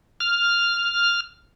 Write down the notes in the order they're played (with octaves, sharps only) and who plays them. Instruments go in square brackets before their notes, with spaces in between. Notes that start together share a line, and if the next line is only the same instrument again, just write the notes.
[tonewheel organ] F6